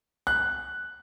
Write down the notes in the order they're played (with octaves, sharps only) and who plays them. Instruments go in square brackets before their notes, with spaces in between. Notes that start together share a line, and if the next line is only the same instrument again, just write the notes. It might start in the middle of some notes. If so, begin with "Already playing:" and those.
[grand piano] F#6